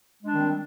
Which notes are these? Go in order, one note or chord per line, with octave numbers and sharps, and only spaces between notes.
D#3 G3 G#3 C4 D4